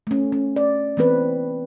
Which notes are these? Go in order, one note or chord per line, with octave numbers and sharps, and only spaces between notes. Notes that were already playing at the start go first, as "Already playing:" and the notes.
A3 C#4
C#4
D5
E3 B3 C4 B4